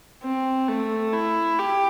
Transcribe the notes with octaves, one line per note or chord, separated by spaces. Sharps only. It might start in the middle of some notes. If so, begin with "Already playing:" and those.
C4
A3
E4
G4